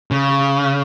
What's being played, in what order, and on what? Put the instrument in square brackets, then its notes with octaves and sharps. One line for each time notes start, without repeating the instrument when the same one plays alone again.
[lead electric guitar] C#3